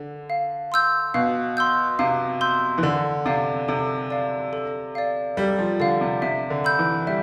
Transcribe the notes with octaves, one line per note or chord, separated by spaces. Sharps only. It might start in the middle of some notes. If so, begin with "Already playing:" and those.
Already playing: D3
F5
C6 E6 G6
B2 F5
C6 E6 G6
C3 F5
C6 E6 G6
E3
D3 A4
C3 D5 F5
C3 A4
D5 F5
A4
D5 F5
G3 A4
F3
D3 D5 F5
C3
C3 E5
D3
B5 E6 G6
E3
G3 E5